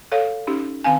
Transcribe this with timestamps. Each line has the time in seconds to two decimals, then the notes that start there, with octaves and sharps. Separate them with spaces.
0.12 A4 C#5 F5
0.47 C#4 D#4 G4
0.84 D#3 C4 F5 G#5